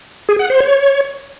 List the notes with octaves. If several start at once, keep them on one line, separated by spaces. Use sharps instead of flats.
G#4
F#5
C5
C#5